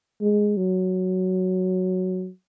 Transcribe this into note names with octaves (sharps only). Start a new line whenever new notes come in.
G#3
F#3